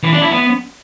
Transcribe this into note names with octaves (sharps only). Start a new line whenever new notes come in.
E3
D4
E4
B3